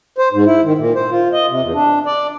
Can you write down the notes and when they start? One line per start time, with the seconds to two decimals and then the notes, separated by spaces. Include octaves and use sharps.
0.18 C5
0.33 G#2
0.45 E4
0.64 D#3
0.78 A#2
0.96 C5
1.11 F4
1.33 D#5
1.49 C3
1.62 E2
1.74 D4
2.06 D5